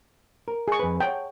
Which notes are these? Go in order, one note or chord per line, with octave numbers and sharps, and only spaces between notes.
A#4
G#4 C#6
F2 B4
C#5 F#5 G5 A5